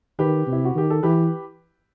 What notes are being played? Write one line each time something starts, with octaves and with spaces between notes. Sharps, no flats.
D#3 G4 B4
C3
E4
F#4
D#3 G4
A4
E3 G4 B4